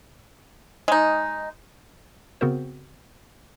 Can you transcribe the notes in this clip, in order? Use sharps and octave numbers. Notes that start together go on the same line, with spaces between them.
G#3 D#4
C#3 B3 C4 F#4 A#4 C5